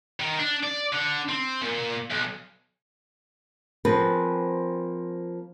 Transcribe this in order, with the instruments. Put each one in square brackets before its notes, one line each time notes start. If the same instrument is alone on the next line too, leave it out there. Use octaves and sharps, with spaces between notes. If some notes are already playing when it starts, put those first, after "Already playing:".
[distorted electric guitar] D#3
D4
D5
D3
C4
A#2
B1
[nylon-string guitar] F3 A#3 C4 G#4 B4